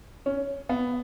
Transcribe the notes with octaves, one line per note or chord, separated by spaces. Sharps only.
C#4
B3